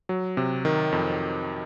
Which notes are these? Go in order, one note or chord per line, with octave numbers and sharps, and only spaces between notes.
F#3
C3
D#3
F2